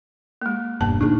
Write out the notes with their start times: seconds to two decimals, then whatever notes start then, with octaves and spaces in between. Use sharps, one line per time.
0.42 G#3 A#3
0.81 E1 G2 A#3 A5
1.01 D2 A#2 D4 D#4 G#4